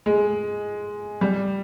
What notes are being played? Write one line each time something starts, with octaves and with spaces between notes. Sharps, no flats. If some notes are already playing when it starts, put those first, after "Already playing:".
G#3
G3